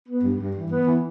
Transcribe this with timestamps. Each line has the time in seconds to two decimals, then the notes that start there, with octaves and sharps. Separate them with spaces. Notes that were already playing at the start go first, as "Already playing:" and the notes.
0.08 B3
0.23 G2
0.40 G2
0.55 E3
0.71 B3
0.87 E3